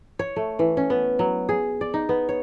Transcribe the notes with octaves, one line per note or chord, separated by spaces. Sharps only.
C#5
A3
E3
C#4
B3
F#3
G#4
D5
D#4
B3
C#5